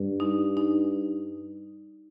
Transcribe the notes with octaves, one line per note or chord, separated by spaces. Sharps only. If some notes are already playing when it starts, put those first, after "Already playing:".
Already playing: G2
D#4
D#4